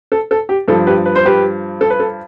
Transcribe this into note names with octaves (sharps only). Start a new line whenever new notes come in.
A4
A4
G4
G2 F3 A4
G4 B4
B4
C5
G4 B4
A4
B4
A4